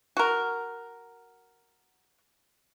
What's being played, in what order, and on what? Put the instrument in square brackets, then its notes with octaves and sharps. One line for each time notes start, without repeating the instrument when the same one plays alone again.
[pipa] F#4 A#4